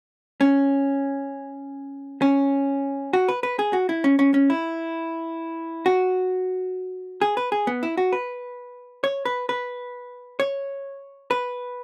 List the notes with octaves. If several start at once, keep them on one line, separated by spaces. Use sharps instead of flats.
C#4
C#4
F#4
B4
B4
G#4
F#4
E4
C#4
C#4
C#4
E4
F#4
G#4
B4
G#4
B3
E4
F#4
B4
C#5
B4
B4
C#5
B4